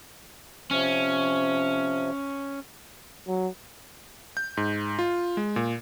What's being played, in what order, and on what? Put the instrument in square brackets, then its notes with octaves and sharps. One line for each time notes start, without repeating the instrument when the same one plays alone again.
[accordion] C3 F3 [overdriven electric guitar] C#4
[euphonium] F#3
[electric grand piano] G6
G#2
F4
G#3
A#2